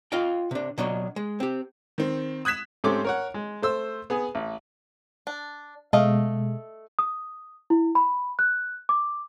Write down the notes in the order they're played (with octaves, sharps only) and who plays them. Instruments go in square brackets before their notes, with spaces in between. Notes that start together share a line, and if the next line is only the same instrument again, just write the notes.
[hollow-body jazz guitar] F4 D#5 F5 G5
C3 D4
B2 F#3 D4 D#5
G#3
C4 G4
[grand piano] D#3 C4
D#6 F#6 G#6 B6 E7
[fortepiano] G#2 A3 C4 C#4 G4 D6
A#4 C#5 F#5
G#3
A3 C5 E6
B3 G#4
A1
[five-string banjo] D4
[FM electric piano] B2 G#3 [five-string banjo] A3 D#5 F5
[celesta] D#6
E4
B5
F#6
D6